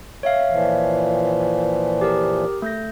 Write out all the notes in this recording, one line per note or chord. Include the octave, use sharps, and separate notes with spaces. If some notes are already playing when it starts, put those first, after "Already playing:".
C#5 E5 F5
A#2 E3 F3
G4 G#4 A#4
A3 G6 A#6